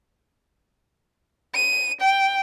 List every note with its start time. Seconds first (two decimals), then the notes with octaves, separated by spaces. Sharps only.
1.55 D#7
2.01 G5